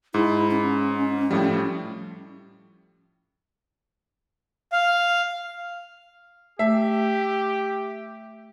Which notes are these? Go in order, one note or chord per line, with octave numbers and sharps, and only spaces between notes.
G#2 E4
C#4
A2 F3 G3
F5
A3 G4 E5